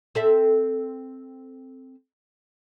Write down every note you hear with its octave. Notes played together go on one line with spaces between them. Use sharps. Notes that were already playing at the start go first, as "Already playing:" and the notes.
C4 A4 E5